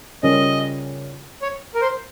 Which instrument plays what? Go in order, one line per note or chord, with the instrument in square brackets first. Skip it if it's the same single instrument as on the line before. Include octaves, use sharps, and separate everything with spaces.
[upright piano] C#3 G3 C#4 F4 A#4 [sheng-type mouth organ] D#5
[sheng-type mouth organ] C#5
A#4
C5